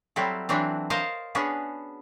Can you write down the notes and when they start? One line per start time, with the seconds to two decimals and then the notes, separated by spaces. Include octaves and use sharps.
0.16 F#3 G3 C4 E4 A4
0.49 E3 F#3 C4 D4 E4 F#4
0.90 A#4 C5 C#5 D#5 F5 A5
1.35 B3 C#4 D4 F#4 G#4